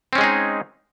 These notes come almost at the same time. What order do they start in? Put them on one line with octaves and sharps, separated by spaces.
C4 C#4 G#3 G#4 D#4